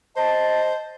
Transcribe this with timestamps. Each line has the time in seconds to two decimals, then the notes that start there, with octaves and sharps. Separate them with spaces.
0.16 C5 D#5 A5